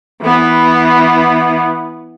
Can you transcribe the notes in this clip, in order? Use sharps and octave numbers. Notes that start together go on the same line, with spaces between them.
E3 B3